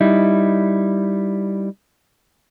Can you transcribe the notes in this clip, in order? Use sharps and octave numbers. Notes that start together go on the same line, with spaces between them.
G3 D#4 E4